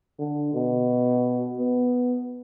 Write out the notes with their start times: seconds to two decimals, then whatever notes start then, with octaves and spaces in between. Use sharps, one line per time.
0.19 D3
0.54 B2
1.59 B3